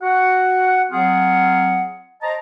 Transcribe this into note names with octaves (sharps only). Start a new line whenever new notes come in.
F#4 F#5
F#3 C4 F4 G#4 F#5
C5 D#5 A5 A#5